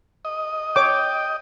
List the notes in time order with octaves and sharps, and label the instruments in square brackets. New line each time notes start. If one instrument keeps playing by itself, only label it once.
[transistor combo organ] D#5
[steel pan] C#5 D6 [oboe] G5